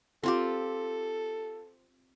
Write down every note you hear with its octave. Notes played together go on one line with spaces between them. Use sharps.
C4 F4 G4 A4